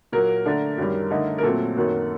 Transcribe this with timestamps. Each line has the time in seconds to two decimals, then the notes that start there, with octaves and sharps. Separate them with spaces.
0.12 A#2 F#3 A#3 A#4
0.45 D3 A3 D4
0.78 F#2 D#3 G3
1.11 D3 A3 D#4
1.38 A#4
1.43 A#2 F#3 A3 C4 A4
1.76 F#2 D#3 F#3 A#3